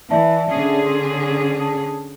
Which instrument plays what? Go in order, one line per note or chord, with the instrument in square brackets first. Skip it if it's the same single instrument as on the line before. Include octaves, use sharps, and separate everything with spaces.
[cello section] E3 [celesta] D5 E5 A5
[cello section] D3 C#4 G#4
[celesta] C6
A5 D#6